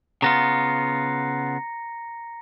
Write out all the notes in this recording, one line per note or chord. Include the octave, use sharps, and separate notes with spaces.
C#3 B3 F4 A#5 A#6 C#7